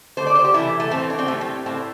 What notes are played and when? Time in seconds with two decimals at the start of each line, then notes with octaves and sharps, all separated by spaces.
0.17 D3 A3 C5
0.27 D5
0.35 C5
0.44 G4
0.54 C3 E3 A3 E4
0.80 A3
0.91 A2 E3 A3 C4
1.10 D4
1.19 C4
1.28 A2 G3 A3
1.41 C4
1.66 A2 A3 C4